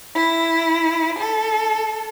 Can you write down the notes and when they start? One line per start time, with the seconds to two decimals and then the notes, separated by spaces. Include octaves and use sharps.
0.15 E4
1.19 A4